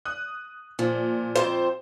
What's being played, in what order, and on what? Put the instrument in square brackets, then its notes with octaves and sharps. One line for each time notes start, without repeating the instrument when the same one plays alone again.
[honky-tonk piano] D#6 F#6
[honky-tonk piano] A#2 [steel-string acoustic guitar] F3
[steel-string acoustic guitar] F2 F3 G5 [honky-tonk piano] C5